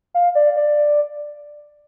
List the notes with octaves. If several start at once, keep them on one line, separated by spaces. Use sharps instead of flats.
F5
D5
D5